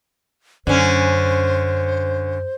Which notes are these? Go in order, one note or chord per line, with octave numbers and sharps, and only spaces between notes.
F#2 D3 C#4 C5